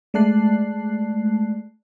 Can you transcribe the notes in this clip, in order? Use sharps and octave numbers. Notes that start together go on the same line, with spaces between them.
G#3 A3 D5 A5 F#6 C7